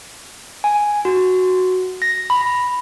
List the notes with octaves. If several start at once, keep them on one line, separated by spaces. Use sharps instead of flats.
G#5
F#4
A#6
B5